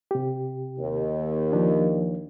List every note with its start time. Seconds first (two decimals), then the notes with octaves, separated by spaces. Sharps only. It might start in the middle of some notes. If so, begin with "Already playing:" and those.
0.11 C3 G4
0.78 D#2
1.53 F3 D4